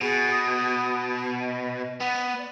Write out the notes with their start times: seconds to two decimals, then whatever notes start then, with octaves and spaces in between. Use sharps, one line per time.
0.01 B2 G#4
0.31 D#6
1.39 D#5
2.00 B3 F#5
2.38 D5